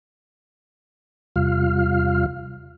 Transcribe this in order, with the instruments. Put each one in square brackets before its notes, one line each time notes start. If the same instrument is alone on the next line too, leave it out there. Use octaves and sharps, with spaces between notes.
[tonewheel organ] E2 C3 G3 F4 F5 F6